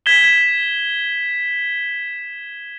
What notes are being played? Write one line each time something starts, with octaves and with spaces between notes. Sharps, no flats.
G#6 B6 E7 G7